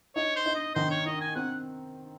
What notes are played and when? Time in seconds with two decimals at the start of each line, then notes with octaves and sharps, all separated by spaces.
0.16 D#4 C#5
0.36 C5
0.46 D#4
0.55 D#5
0.75 D#3 C5
0.91 C#5
1.06 D#4 D#5
1.21 G#5
1.35 C4 F#5